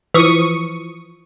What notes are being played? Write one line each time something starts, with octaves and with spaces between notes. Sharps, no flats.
E3 F3 C#6 D#6